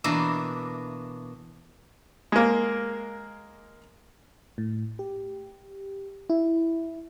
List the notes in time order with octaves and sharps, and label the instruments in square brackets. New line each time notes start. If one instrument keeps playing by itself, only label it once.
[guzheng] B2 E3 A#3 D4 D5 E5
[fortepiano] G#3 A#3
[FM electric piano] A2
G4
E4